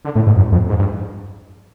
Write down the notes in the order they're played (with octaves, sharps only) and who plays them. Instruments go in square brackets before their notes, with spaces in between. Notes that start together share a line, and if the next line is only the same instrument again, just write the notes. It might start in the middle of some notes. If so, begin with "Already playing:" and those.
[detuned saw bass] D3
A2
G#2
F#2
F2
G#2
G2